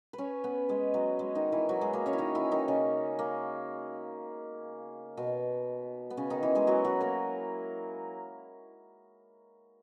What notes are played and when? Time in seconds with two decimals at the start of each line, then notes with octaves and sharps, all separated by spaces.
0.13 B4
0.18 C#4 C#5
0.44 B3 B4
0.69 G#3 G#4
0.94 F#3 F#4
1.19 G#3 G#4
1.35 D#3 D#4
1.52 E3 E4
1.69 F#3 F#4
1.81 G#3 G#4
1.93 A#3 A#4
2.06 C#4 C#5
2.13 E4
2.18 D#3 D#4
2.35 E3 E4
2.52 D#3 D#4
2.68 C#3 C#4
3.19 A#3
5.17 B2 B3
6.10 B3
6.17 C#3 C#4
6.30 D#3 D#4
6.43 E3 E4
6.55 G#3 G#4
6.67 F#3 F#4
6.85 F#3 F#4
7.01 A#3 A#4